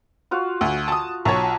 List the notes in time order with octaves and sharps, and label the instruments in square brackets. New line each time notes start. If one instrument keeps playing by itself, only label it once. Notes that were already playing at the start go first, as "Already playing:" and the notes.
[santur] F4 F#4 F5
[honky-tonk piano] D2
A5 D#6
[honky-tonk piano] B1 C#5 [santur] A5 A#5 C#6